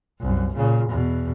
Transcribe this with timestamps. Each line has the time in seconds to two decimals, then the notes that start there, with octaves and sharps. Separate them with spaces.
0.20 C2 F#2
0.55 A#2 C#3
0.90 E2 B2